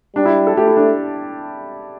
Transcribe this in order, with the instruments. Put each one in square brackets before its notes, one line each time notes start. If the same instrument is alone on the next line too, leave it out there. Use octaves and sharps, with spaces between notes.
[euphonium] G3 [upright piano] D4
[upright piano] E4
A4
[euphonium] A3 [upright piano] G4
[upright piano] E4
D4